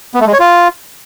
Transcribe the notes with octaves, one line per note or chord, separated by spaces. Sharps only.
B3
A3
G#3
C#5
F4